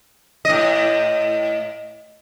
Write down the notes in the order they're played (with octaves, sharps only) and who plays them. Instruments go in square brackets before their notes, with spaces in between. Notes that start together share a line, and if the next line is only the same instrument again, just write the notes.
[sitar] A2 D#5